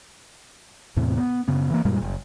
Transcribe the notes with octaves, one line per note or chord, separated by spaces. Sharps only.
E2 A2 C3
B3
F#2 C#3 B3
E3 A#3
F#2 A#2 G3 G#3
F#1